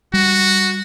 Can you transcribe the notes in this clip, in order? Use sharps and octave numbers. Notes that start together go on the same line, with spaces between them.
G3 F#4